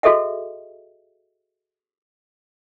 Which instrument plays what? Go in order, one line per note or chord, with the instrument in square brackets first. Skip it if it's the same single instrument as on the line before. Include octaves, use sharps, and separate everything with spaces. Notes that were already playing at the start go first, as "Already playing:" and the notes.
[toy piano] F#4 G#4 A4 D#5 E5 F#5